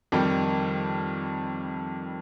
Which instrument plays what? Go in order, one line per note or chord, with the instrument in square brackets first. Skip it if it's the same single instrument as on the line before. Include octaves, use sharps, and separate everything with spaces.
[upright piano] F2 D#3 G3 G4